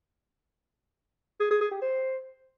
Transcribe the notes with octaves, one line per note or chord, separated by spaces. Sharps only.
G#4
G#4
G#4
G4
C5